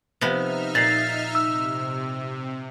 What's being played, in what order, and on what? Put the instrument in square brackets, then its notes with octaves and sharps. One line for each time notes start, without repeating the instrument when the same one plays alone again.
[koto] C3 F3 B3 [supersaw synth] D#4 E5 F6
[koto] A#2 [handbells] A6 C7
[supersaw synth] C3 [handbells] E6